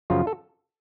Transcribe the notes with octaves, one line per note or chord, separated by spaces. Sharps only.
F#2 C#3 F3 F4
A4